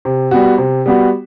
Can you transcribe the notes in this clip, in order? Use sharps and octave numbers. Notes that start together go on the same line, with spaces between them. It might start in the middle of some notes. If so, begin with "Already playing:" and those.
C3
G3 B3 F#4
C3
G3 B3 F#4